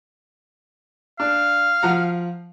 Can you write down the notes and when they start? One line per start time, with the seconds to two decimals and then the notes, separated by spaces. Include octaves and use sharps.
1.20 D4 F5
1.83 F3 F#5 A#5